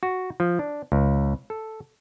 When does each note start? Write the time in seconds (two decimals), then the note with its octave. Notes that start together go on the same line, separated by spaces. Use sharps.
0.03 F#4
0.40 F3
0.59 D4
0.92 C#2
1.50 A4